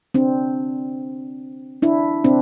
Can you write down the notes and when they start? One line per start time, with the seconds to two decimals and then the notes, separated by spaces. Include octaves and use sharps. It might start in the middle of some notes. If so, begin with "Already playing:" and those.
0.14 C4 D4
1.82 D4 E4
2.24 C4 D4